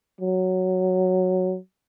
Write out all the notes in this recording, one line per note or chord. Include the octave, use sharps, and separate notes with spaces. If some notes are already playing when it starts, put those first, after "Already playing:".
F#3